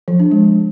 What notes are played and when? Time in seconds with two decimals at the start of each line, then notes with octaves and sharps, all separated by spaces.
0.08 F3
0.20 D4
0.31 G#3